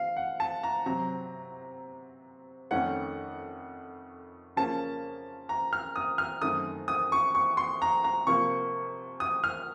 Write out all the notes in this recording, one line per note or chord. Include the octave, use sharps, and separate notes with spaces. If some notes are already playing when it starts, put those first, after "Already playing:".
Already playing: F5
F#5
A5
A#5
C3 F#3 C4 A#5
F2 D#3 A3 C#4 F#5
C#3 F3 A#3 C#4 A5
A#5
F6
D#6
F6
F#2 D#3 A3 C4 D#6
D#6
C#6
C#6
C6
A#5
A#5
C3 F3 A#3 C#6
D#6
F6